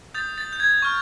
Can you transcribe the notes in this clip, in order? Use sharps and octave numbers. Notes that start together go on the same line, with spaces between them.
D#6 G6 A6
A6
G6
G#6
C#6 F6